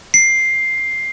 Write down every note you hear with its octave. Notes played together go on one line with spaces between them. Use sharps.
C7